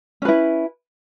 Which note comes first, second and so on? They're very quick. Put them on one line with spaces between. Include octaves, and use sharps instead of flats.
C#4 B4 E4